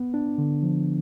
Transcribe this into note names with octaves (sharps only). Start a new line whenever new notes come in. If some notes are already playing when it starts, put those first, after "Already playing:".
Already playing: B3
D4
D3
F3